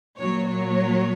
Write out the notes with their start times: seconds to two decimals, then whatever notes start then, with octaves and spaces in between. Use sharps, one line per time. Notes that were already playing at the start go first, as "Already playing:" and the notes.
0.18 A#2 F#3 C#5
0.48 C#5